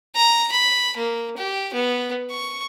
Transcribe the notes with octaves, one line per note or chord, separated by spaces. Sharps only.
A#5
B5
A#3
G4
B3
C#6